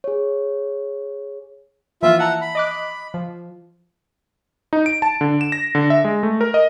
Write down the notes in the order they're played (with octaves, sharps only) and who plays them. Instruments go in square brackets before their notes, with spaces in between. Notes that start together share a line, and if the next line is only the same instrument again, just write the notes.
[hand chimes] G#4 C#5
[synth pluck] E3 F3 A#3 [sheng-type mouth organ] F4 E5
[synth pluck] E5 A5 A#5 [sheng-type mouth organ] F#5
[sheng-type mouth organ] B5
[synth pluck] D#5 D6 F#6
F3
[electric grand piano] D#4
D7
A5
D3
E7
A#6
D3
E5
G#3
A3
A#4
D#5